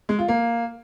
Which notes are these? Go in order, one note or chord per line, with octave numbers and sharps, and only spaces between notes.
G#3
F4
A#3